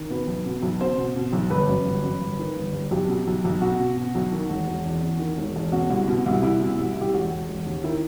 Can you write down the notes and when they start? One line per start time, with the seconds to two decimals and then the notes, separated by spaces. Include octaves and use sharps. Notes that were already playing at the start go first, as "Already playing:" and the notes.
Already playing: D#3
0.10 B2 B4
0.27 B1
0.46 B2
0.62 B1
0.81 B2 C5
0.98 B2
1.16 B2
1.33 B1
1.50 G1 B4
1.69 F#2
1.85 G1
2.04 F#2
2.22 G1
2.39 D#3
2.56 G1
2.73 G1
2.91 B1 G4
3.09 B2
3.27 B1
3.45 B1
3.61 B2 F#4
3.80 B2
3.96 B2
4.15 B1
4.32 D#3
4.49 E1
4.68 E1
4.85 E2
5.02 E2
5.19 D#3
5.38 E1
5.56 E1
5.72 B2 F#4
5.90 C2
6.08 B2
6.26 C2
6.42 C2 E4
6.60 B2
6.78 C2
6.96 C2 G4
7.14 E1 F#4
7.31 E1
7.49 E1
7.66 D#2
7.84 D#3 E4